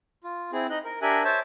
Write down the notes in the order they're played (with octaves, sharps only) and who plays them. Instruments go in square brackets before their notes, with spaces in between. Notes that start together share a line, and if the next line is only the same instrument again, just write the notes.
[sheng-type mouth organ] F4
C4 E4 G#4
D#4 D#5 F#6
A#4
D4 G4 A#4 E5 G#5 F#6
C5 C#5 E5 A5